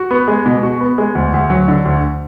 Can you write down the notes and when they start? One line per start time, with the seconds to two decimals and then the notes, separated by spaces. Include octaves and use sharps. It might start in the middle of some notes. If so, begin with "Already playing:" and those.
Already playing: F#4
0.11 B3
0.28 G#3
0.46 B2
0.63 F#4
0.81 B3
0.98 G#3
1.15 D2
1.34 D2
1.50 F#3
1.68 D3
1.85 D2